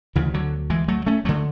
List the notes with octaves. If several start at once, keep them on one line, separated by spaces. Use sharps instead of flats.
D2 C#3 E3
D3 F#3
E3 G#3
F#3 A3
A3 C#4
D2 D3 F#3 A3